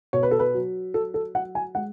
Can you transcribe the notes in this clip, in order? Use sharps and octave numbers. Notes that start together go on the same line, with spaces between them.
B2 C#5
B4
A4
B4
F#3
F#3 A4
A4
F#3 F#5
G#5
G#3 F#5